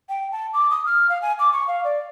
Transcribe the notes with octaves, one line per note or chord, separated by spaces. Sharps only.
G5
A5
D6
D#6
F6
F5
G#5
D6
C#6
F5
D5